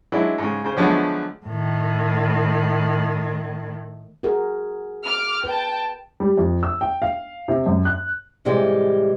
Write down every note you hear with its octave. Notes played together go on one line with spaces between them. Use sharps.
F#3 G#3 D4 E4
G#2 C#3
C#3 C5
D3 F3 F#3 G#3 A3 B3
A2 D#3
F#4 G#4 A#4
D6 F6
B4 G5 A5
G3
F2
E6
G5
F5
C3
F#2
F#6
A2 C3 E3 G3 G#3